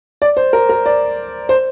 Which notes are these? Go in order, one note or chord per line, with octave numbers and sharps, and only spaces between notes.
D5
C5
A#4
A#4
D5
C5